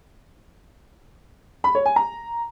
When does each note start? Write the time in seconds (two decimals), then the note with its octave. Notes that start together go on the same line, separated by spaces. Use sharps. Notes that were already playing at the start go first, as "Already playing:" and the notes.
1.64 B5
1.75 C#5
1.86 G#5
1.96 A#5